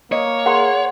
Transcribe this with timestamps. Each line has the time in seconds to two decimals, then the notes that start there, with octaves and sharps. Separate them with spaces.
0.12 A#3 C#5 D#5
0.46 G#4 A#4 F#5 C6